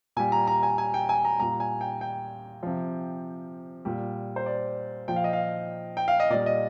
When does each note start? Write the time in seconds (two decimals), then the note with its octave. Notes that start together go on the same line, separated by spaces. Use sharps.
0.16 A#2 G3 G#5
0.32 A#5
0.47 A#5
0.63 G#5
0.78 G#5
0.94 G5
1.09 G#5
1.25 A#5
1.39 A#2 G3 A#5
1.60 G#5
1.81 G5
2.01 G5
2.63 C3 F3
3.85 A#2 G3
4.36 C5
4.46 D5
5.08 A#2 F3 G5
5.16 F5
5.24 D#5
5.33 F5
5.97 G5
6.08 F5
6.20 D#5
6.30 A#2 G3 D5
6.46 D#5